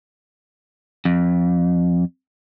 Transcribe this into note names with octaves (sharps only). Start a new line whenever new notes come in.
F2